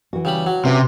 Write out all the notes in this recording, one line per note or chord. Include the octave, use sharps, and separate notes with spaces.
E3 F#4
C#3 G3 B5
F#3
C3 C#4 B4 E5